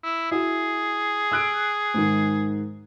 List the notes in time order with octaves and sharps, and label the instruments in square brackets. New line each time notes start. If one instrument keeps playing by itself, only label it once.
[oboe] E4
[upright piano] E4 F#4 [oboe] G#4
[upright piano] E6 F#6 D7
G#2 D#3